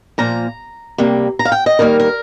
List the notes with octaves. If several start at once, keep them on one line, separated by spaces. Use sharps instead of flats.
A#2 F3 A#3 A#5
C3 G3 A#3
A#5
F5
G5
D#5
D#3 G3 A#3 A#4
A#4